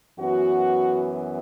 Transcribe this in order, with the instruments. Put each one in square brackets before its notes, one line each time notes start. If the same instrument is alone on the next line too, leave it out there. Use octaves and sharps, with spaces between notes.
[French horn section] F#2 E3 B3 F#4